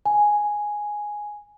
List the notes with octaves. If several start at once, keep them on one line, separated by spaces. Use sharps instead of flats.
G#5